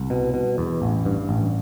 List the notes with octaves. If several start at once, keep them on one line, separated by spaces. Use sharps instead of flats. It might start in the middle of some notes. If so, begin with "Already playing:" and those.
Already playing: C2
B2
B2
E2
A1
G2
A1